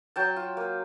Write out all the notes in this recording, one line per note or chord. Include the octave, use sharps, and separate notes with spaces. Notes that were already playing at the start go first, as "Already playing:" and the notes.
F#3 G5 A5
F4
A#3